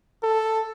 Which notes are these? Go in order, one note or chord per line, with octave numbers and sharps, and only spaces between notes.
A4